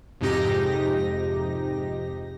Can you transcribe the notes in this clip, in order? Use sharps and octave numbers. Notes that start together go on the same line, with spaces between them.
F2 G#2 C3 D#4 G4 A#6